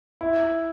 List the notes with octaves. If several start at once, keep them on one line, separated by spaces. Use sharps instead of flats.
E4